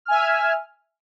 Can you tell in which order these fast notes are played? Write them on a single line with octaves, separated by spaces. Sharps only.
F6 G#5 E5